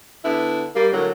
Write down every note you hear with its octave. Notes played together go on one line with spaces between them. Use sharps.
D3 B3 E4
G3 A#3
A2 D3 F#3 A#3